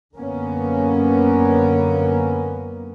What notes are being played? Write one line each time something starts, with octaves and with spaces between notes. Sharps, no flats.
F#2 D3 A#3 B3 C#4